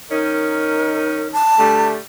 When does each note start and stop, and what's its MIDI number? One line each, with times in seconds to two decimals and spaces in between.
0.10 1.37 51
0.10 1.37 61
0.10 1.37 63
0.10 1.28 70
1.33 1.87 81
1.58 1.95 50
1.58 1.95 55
1.58 1.95 57